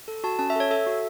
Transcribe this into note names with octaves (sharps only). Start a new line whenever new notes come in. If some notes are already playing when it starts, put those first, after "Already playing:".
A4
F#4 A5
C#4 A5
E5
A4 C#5
A4 E5
F#4